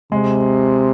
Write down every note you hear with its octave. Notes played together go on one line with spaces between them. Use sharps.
C3 G#3